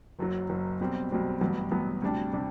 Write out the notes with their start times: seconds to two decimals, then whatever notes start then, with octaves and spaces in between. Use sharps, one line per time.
0.19 F#1 F#2 F#3
0.49 F#1 F#2 F#3
0.81 B1 B2 G3 C4
1.11 B1 B2 G3 C4
1.41 A1 G2 F#3 B3
1.71 A1 G2 F#3 B3
2.02 D2 C3 G3 D4
2.33 C3 G3 D4